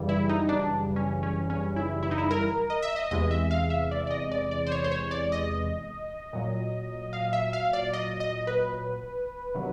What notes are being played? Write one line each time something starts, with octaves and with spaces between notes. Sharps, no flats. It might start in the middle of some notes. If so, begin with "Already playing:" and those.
Already playing: F#2 C#3 E3 G3
E4
D#4
D4
C#4
C#4
C#4
E4
E4
D#4
E4
A#4
D#5
E5
D#5
E2 C3 E3 G#3 D#5
E5
F5
E5
D5
D5
D#5
D5
D5
C5
C#5
C5
C#5
D5
D#5
A#2 F#3
F5
E5
F5
D5
D#5
D#5
B4
C3 D#3 F#3